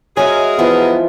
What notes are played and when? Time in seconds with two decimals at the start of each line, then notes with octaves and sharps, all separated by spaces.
0.17 G#3 F#4 G#4 A#4 C#5 D#5 E5 G#5
0.59 E3 F3 B3 F4